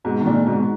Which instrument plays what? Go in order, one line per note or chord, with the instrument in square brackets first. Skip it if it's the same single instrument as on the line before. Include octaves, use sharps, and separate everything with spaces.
[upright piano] G#2 B2 [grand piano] D#4
[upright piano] D#3
[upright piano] A#2 D3 [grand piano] G#3
[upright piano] G#2 B2 [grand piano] D#4